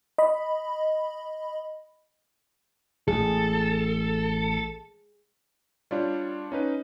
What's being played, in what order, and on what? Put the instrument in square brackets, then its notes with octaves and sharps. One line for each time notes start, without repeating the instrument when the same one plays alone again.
[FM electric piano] D#5 B5
[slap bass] A1 [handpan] G#4 [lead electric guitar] A4
[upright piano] G3 [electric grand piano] D4 F4 C#5
[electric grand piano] C#4 D#4 B4